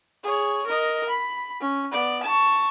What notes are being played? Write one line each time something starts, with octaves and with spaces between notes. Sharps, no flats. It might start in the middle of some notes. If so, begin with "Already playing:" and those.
G#4 C#5
A#4 D#5
B5
C#4
B3 D5
A5 C#6